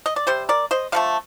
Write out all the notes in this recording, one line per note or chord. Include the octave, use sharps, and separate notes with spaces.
D#5
D5
C3 G3 C5
A#4 D5
C5 D#5
D3 F3 A3 F5